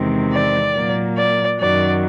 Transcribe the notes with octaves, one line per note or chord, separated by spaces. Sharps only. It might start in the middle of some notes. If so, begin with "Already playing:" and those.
Already playing: E2 C3 D#3 G#3 C4
D5
A#2 F#3 A#3
D5
F#2 D#3 F#3 D5